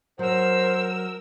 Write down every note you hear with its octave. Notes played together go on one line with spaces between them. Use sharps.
F#3 A#4 C5 E6